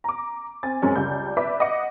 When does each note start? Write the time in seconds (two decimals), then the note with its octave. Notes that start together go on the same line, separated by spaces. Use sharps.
0.04 A#5 D6
0.63 C4 G#5 A6
0.82 F#2 G#3 C4 C#4
0.96 C#2 G3 D5 G6
1.37 B4 D5 E5 D6 B6
1.60 D#5 F#5 D6 C#7